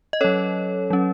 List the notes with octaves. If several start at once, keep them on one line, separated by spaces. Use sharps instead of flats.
D#5
F#3 C#4 A4 C#5
F#3 C#4